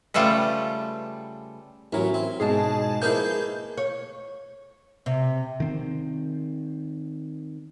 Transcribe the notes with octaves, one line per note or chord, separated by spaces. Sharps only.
C#3 G3 A3 F4 A4 B4
A1 F#3 C#4 E4 A#4
C4
G#2 B2 G#3 G#4 A5
F3 A#3 D#4 E4 G#4 B4 G6
C#5
C3
D#3 C4